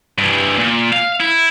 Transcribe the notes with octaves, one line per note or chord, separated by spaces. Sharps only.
G2 E3
A#2
F5
E4